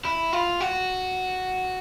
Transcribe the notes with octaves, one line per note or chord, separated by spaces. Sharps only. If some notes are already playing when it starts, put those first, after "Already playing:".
E4
F4
F#4